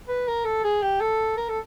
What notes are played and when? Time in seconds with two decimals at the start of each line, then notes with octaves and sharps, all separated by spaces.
0.08 B4
0.27 A#4
0.45 A4
0.64 G#4
0.82 G4
1.01 A4
1.37 A#4
1.48 A4